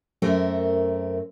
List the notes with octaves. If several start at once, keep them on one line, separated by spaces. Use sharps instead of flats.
F#2 A3 C4 A#4